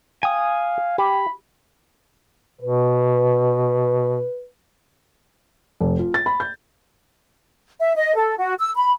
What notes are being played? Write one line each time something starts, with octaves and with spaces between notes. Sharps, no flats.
F5 G5 G#5 D#6
G4 B5
B2 B4
F1
F4
A6
B5
G6
E5
D#5
A4
F#4
E6
B5